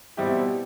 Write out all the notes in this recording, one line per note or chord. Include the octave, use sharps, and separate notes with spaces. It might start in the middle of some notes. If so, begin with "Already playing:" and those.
B2 G3 C4 E4 G4